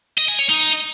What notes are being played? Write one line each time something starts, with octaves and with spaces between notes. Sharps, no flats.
D#5
G#5
C#5
D#4